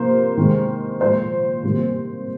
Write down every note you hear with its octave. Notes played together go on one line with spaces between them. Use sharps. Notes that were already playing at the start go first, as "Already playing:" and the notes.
Already playing: C3 F3 A#3 C5
C3 D#3 G#3
A#2 F3 G#3 C5
C3 D#3 G3 A#3